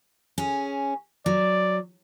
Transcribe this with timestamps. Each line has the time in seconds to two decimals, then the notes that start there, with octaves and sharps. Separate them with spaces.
0.38 C#4 G#4
1.26 F#3 D5